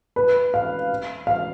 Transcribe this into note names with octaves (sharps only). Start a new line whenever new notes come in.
B4
F5
F5